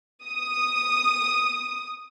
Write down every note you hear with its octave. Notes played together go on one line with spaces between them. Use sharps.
D#6